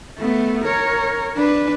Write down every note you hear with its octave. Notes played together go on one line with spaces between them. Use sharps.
A3 B3
A#4 C#5
D4 B4